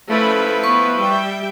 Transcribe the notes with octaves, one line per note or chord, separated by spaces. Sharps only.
F3 A3 C#4 E4 B4 B5
B3 C#6
G3 E5 G5